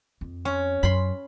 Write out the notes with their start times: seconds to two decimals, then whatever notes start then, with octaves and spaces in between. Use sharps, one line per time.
0.21 F2
0.45 C#4
0.83 F#2 B5 C6